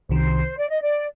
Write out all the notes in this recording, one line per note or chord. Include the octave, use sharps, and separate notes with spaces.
C2 C3 D#3 C5
D5
D#5
D5